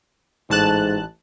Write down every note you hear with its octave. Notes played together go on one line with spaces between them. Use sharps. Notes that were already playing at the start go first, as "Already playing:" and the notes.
A1 G#2 A5 F#6